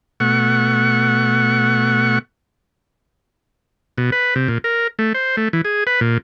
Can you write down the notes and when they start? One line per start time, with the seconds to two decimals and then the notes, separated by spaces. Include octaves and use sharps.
0.20 B2 A3 F#5 C#6
3.98 B2
4.12 B4
4.35 C3
4.48 A#2
4.64 A#4
4.99 A3
5.14 C5
5.37 A3
5.53 E3
5.65 G#4
5.87 B4
6.01 A#2